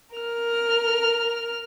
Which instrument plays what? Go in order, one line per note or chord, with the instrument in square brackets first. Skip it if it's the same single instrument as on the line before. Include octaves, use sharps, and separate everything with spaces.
[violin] A#4 F6